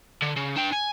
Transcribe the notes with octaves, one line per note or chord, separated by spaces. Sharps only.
D3
C#3
D4 G5
G#5